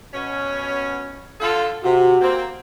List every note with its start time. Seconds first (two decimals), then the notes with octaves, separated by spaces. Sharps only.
0.13 B2 C#4
1.40 D3 F4 A4
1.84 C3 F#4
2.21 A#3 C4